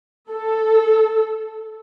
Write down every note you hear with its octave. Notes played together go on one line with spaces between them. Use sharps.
A4